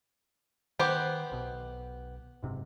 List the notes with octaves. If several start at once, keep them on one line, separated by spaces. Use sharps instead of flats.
D#3 B3 G4 C5
B1 B2
F#1 G#2 C3